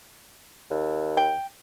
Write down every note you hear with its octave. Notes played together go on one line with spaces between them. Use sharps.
D#2
G5